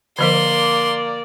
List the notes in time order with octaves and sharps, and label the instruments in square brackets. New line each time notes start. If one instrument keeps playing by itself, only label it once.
[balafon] D3 F3 C5 [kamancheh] A#3 D5 [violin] C6